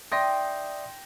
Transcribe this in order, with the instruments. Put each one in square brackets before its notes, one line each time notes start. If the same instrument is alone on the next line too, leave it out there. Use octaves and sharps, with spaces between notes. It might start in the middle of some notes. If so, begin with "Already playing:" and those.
[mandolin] D#4 G5 [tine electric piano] D5 E5 D#6 [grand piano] C6 A#6